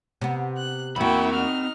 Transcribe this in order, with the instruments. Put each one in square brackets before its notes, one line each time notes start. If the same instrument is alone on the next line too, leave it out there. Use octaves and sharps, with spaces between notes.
[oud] C3 B3
[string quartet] F#6
[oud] E2 A#3 [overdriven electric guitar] C4 B5 [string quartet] E4 F#4 G5
[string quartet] D#4 F6